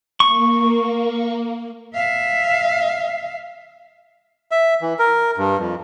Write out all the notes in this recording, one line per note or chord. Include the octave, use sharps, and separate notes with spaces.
A#3 C#6
E5 F5
E5
E3
A#4
G2
F2